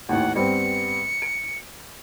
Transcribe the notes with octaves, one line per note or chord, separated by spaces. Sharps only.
A1 D#2 F#5
G2 B3 C4 C#7
D7